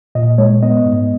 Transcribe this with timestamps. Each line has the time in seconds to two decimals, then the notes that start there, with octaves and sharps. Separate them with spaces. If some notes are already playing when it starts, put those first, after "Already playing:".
0.15 A#2 D#5
0.38 G#3 C#5
0.63 B3 D#5
0.86 G#2